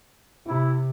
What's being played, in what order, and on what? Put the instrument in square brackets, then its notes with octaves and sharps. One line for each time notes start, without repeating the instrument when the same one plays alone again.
[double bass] C3 [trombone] E4